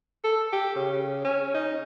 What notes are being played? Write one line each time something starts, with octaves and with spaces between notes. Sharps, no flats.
A4
G4
C#3
C#4
D#4